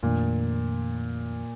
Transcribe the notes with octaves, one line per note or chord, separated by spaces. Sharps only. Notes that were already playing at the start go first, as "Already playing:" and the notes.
F2 A#2 D#3 A3 D4